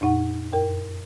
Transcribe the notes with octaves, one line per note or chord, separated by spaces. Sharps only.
F2 A#2 D#4 F#5
F#2 A#4 G5